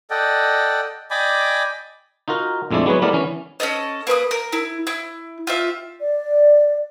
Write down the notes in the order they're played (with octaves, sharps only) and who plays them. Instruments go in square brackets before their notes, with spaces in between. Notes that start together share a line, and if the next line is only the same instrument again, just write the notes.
[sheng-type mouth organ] A4 D5 D#5 F#5 G5
D5 D#5 G5 G#5 B5 D6
[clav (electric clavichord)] D#4 F4 F#4 A#4
A#1 F2 G#3 A3 E4 D5
F#3 G#3 B3 B4 C#5
G3 A3 B3 E4 A#4 D5
E3 C#4
[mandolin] C#4 A4 D5 D#5
A#3 B4 C6 D#6
A#4
E4
E4
F4 G4 E5
[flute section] D5